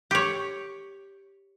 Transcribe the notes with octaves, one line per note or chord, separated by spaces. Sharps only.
G4 C#5